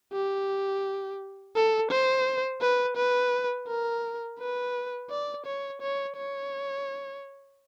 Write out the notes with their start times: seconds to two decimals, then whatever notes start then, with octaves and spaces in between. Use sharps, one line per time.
0.12 G4
1.55 A4
1.91 C5
2.61 B4
2.97 B4
3.68 A#4
4.39 B4
5.10 D5
5.46 C#5
5.81 C#5
6.17 C#5